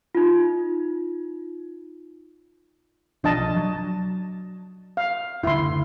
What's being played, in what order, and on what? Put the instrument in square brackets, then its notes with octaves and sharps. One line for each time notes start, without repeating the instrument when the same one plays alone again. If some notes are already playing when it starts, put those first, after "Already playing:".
[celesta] D#4 F4
[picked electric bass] B1 F3 [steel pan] D4 D#5 A5
[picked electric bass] F#3
[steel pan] F5
[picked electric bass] F#1 D2 D3 [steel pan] E4 C6